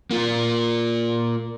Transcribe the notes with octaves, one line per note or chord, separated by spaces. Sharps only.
A#3 F4